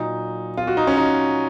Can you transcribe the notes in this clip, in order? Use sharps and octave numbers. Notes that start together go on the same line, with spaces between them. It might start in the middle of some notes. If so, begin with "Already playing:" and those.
Already playing: A#2 F#3 D#4
F4
F#4
D#4
C#4
D#4